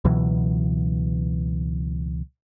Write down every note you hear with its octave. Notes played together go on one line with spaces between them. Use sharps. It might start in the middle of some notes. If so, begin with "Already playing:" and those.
C#2 B2 E3 F#3